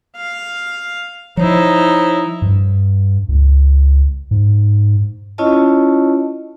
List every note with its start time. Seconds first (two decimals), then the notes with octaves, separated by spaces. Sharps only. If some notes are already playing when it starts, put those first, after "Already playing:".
0.16 F5
1.37 F3 D#4 E4 C5 C#5
2.42 G2
3.29 C#2
4.31 G#2
5.38 C#4 E4 F4 C#5 D#5 A5